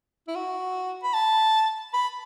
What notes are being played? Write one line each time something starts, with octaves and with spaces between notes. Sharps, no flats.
E4
F#4
B5
A5
B5